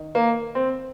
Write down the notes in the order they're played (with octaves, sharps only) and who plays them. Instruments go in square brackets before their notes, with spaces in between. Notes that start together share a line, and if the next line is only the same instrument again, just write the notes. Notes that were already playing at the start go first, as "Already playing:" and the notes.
Already playing: [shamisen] D#3
[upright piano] A#3
C4